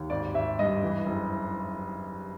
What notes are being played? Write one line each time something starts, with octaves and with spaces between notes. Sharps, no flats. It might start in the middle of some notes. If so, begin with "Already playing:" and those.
Already playing: D#2
G#1 D5
G#1 E5
G2 D#5
E3
F#1